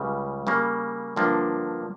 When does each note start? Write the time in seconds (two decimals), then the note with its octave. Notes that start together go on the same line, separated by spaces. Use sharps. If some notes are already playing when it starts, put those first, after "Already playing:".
Already playing: C#2 C#3 G3
0.47 C#3 G3 A#3 C#4
1.16 G2 D3 F3 A#3 D4